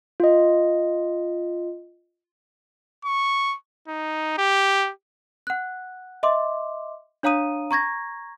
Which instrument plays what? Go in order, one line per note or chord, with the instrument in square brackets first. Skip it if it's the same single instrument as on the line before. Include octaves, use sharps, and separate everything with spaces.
[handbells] F4 D#5
[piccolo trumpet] C#6
D#4
G4
[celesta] F#5 F#6
D#5 E5 C6 D6
D4 C#5 F5 A#5 D#6 D#7
A#5 C#6 G#6 A#6